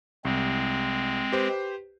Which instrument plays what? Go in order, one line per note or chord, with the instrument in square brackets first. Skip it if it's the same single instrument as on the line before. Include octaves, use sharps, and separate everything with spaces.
[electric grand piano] C2 [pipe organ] G#3 C4
[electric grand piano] G4 B4 C5